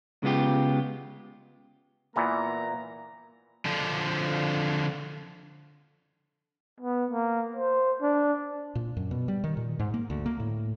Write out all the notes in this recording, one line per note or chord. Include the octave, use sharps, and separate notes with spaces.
C#3 G#3 B3 F4 G4
A#2 E3 A#3 B3 A#5
D3 F3
B3
A#3
C5
D4
A#2
F#2
B2
G3
D#3
A#2
G#2
A#3
D2
A#3
A2